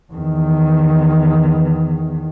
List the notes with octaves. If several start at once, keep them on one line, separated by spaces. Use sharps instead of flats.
E2 D#3